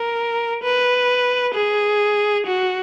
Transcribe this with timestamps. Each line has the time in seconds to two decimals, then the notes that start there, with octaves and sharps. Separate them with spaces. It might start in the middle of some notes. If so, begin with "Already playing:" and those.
Already playing: A#4
0.63 B4
1.55 G#4
2.47 F#4